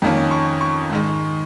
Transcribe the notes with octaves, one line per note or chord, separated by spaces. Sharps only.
F2 D#3 A#3 C#4
C#6
C#6
G#2 D#3 G#3